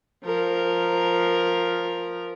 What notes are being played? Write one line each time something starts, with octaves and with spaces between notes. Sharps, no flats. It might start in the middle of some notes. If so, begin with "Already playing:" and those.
F3 A#4